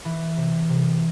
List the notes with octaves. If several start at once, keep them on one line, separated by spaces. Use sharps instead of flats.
E3
C3
C3